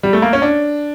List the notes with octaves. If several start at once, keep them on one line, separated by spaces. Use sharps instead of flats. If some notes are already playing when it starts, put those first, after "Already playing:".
G3
A3
A#3
C#4
D4